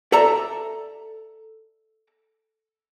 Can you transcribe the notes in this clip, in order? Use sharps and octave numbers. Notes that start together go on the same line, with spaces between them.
A4 D5 E5 A5 A#5